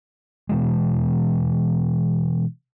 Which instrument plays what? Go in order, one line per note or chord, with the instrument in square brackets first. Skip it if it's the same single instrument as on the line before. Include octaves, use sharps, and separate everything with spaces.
[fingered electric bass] B2 E3 G#3